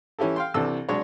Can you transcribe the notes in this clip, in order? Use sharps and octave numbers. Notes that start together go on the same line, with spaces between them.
E3 C#4 E4 G4 A4
F5 G5 C6
C2 C3 E3 D4 A4 E6
C2 F#3 G#3 D4 C#5